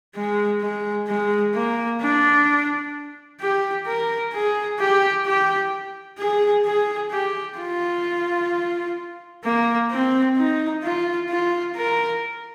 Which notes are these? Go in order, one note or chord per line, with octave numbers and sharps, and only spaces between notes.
G#3
G#3
G#3
A#3
D4
G4
A#4
G#4
G4
G4
G#4
G#4
G4
F4
A#3
C4
D#4
F4
F4
A#4